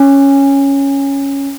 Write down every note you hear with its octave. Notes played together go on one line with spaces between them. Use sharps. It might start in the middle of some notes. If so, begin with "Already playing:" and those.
Already playing: C#4